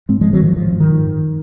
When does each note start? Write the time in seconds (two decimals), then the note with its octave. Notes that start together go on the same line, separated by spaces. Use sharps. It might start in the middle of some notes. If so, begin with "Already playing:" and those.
0.09 G#2 G#3 C4
0.21 G#2 F3 G#3
0.33 D#3 F#3
0.41 G#2 F3
0.57 G#2 F3
0.73 G#2
0.80 D#3
0.89 G#2
1.05 F#2